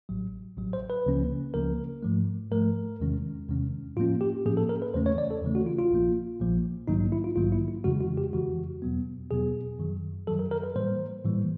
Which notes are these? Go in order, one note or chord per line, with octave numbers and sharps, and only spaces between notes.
A1 A2 F#3
A1 A2 F#3
C5
B4
C#2 C#3 F3 A#3 C#4
C#2 C#3 F3 A#3 C#4 A#4
G#2 F3 A3
G#2 F3 A3 A#4
E2 C3 D#3 G#3 C#4
E2 C3 D#3 G#3 C#4
A2 F3 A#3 C#4 F4
G4
A2 F3 A#3 C#4 G#4
A4
A#4
B4
E2 C#3 E3 A3 C#4 C5
C#5
D5
A4
E2 C#3 E3 A3 C#4
F#4
F4
F4
A#1 A#2 F3 A#3
A#1 A#2 F3 A#3
A#1 G#2 D#3 F#3 A#3 D#4
D#4
E4
F4
A#1 G#2 D#3 F#3 A#3 F4
E4
E4
F2 C#3 E3 G#3 F#4
F#4
G4
F2 C#3 E3 G#3 F#4
E2 B2 F#3 B3
E2 B2 F#3 B3 G#4
F#2 D#3 F#3
F#2 D#3 F#3 A4
A#4
A#4
B4
A2 E3 G3 A#3 C5
A2 E3 G3 A#3